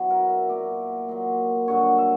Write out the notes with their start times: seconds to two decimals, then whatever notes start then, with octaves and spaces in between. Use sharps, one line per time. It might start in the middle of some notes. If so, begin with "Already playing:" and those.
Already playing: B2 F#3 E4
0.10 A#4
0.30 E5
0.49 A#2 F#3 D5
1.09 A#2 F#3
1.67 G2 D3 F#3 C#5
1.98 E5